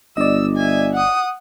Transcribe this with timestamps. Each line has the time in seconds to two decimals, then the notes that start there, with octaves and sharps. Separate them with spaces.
0.17 G1 D5 D#5 E6
0.56 E5 G#5
0.93 F#5 D#6